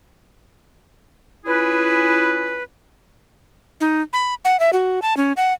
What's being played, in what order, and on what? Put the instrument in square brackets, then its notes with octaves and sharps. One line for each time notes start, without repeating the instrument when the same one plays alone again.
[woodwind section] C#4 E4 F4 G#4 B4
[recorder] D#4
B5
F#5
E5
F#4
A5
C#4
F#5